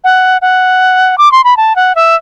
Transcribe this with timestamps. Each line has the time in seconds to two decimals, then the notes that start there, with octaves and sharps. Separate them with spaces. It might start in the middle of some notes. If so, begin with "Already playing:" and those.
0.04 F#5
0.42 F#5
1.18 D6
1.32 C6
1.44 B5
1.57 A5
1.76 F#5
1.95 E5